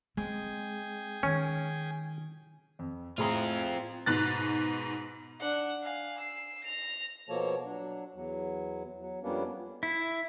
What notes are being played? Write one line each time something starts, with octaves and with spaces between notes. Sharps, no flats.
G#3 C4 G#4 G5 G#5
D#3 C#4
F2
A2 C4 F4 G#4 A#5
G#2 B2 F#6 A6
D4 F#5
F5 G#5
E6 C7
A#6 F7
B2 F3 A#3 A4 C#5 A5
F#3 D4
E2 F#3
F#3
F2 G3 A#3 B3 C#4 D4
E4